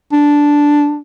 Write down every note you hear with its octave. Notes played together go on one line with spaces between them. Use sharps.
D4